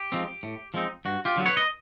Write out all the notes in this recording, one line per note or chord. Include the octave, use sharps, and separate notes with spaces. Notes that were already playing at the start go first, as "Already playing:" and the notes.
Already playing: G4
F3 G#3 C4 D#4
A2
F3 G#3 C4 D#4
G2 F#4
F4 G4
D3 F#3 B3
B4 C#5
D#5